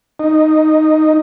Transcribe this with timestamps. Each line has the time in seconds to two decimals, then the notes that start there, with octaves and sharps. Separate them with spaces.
0.20 D#4